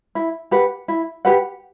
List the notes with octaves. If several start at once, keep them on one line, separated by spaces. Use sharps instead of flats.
E4
G4 B4 F#5
E4
G4 B4 F#5